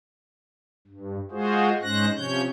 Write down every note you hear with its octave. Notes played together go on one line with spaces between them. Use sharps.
G2
G#3 F4 F#4 G#4 C5
G#2 G#3 C#4 C5 F#6 A#6
C3 F3 C#4 C#5 G6